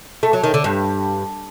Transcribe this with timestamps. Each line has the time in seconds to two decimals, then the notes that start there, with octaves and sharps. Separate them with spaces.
0.23 A3
0.33 F#3
0.44 D#3
0.54 D3
0.64 G2